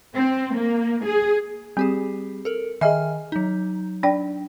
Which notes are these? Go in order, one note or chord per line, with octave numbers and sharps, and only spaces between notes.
C4
A#3
G#4
G3 C4 G4 G#4
A4 A#4
D#3 G#4 D#5 E5 G#5 F6
F#3 D#4
D4 D5 G5